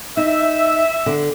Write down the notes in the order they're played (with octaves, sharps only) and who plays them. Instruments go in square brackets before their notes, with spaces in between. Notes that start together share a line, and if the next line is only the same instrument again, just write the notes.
[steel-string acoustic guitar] D#4 [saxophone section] E5
[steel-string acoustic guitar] D3